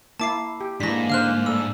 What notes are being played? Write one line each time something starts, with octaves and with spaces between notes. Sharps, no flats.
A#3 E4 A5 D6 C7
G4
G#2 E3 A#3 D4 A#6 B6
D3 C5 F5 F6 F#6
A3 D4 E6